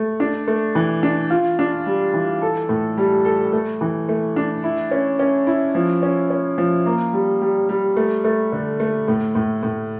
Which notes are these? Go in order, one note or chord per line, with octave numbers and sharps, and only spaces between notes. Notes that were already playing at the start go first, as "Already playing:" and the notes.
Already playing: A3
D4
A3
E3
D4
F4
D4
G3
E3
A4
A2
G3
A4
A3
E3
A3
D4
E4
C#4
C#4
E4
F3
C#4
C#4
F3
A#3
G3
G3
G3
A3
A3
D3
A3
A2
A2
A2